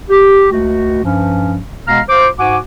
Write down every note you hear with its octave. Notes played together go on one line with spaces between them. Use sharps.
G4
C#2 A3 F#4
G2 F3 C#4
B2 G#3 B3 F5 A#5 F6
F4 C5 D6
G#2 F#4 F#5 G#5 D6